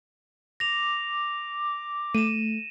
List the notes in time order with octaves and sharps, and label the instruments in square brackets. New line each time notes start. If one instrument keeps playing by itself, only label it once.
[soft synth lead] D6 [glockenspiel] A#6 F7
[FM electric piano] A3 [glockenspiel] D#7 E7